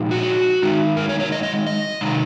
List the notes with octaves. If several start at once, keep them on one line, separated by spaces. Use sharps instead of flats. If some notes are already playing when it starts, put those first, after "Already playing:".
Already playing: A#2 F3 G#3 D#4
F#4
D#3 G#3 D#4
A#4
C#5
C#5
D#5
D#5
D#5
C3 D#3 G#3